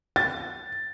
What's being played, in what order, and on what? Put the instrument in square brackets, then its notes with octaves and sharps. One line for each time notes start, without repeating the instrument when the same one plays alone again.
[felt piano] A6